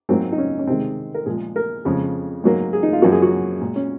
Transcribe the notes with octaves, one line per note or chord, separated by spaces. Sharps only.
G#2 F#3 A#3 C4
D#4
C#4
C#4
C3 D#3 G#3 C4
A#4
A#2 F3 G#3 G#4
A#4
F2 C#3 G#3 G#4
G#2 F#3 A#3
G#4
D#4
F4
F#2 F3 A#3 F#4
G#4
F#4
A#2 G#3
C#4